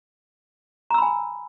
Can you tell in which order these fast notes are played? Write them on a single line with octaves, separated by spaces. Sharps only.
A#5 E6 B5 G#5